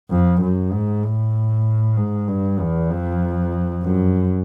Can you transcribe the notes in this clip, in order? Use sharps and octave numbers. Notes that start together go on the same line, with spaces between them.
F2
F#2
G#2
A2
G#2
G2
E2
F2
F#2